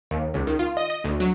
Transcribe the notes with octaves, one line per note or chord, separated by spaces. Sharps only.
D#2
C#2
D#3
F4
D#5
D#5
D2
F#3